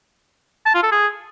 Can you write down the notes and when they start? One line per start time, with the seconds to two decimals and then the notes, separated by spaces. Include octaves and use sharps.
0.66 A5
0.74 F4
0.83 A4
0.92 G#4